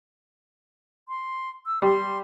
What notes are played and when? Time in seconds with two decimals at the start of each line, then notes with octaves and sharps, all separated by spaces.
1.08 C6
1.66 E6
1.82 G3 C6